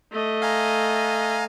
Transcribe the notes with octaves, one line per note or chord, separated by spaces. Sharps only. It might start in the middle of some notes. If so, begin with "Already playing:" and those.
A3 D#5
F5 G#5 A#5